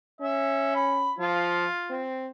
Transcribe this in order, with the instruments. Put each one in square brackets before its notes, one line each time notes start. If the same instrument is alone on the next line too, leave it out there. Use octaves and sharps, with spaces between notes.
[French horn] C#4 [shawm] E5
[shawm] B5
[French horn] F3 [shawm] F4
[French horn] C4